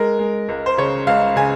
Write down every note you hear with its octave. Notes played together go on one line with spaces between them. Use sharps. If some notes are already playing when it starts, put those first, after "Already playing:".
Already playing: G#3 A#4
G#3
C#2
C5
C#3 C#5
C#2 F5
C#3 G#5